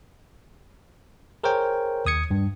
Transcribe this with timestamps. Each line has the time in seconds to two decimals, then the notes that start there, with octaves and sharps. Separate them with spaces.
1.44 G#4 A#4 C5 C#5 G5
2.06 D#2 D#6 G#6 C#7
2.31 G2